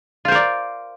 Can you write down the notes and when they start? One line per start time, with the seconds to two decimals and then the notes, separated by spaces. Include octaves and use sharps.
0.25 F4
0.28 C5
0.32 A#4
0.35 D5